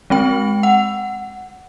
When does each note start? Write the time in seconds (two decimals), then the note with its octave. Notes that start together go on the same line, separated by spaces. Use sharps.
0.10 G#3 C4 G5
0.63 F#5